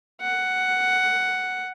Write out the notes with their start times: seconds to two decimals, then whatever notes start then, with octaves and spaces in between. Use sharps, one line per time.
0.21 F#5